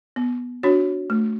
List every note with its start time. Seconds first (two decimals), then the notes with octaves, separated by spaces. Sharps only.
0.16 B3
0.63 D4 F#4 C#5
1.10 A3